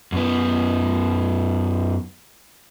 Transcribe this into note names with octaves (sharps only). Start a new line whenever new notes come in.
F#2 B3